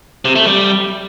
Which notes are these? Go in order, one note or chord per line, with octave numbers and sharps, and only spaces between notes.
C3
A3
G3